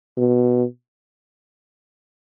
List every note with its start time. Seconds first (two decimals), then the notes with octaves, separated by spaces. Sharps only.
0.18 B2